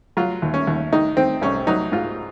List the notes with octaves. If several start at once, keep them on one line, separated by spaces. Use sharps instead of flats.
F#3 F4
D#2
C#4
D#2
D#3 D#4
D#3 C4
C2 C#4
F#3 D#4
G#2 F4